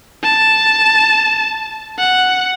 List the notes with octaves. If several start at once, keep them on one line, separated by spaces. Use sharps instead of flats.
A5
F#5